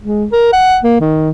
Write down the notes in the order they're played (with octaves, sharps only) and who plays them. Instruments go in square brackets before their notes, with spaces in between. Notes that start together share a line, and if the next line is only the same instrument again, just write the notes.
[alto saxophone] G#3
A#4
F#5
A#3
D#3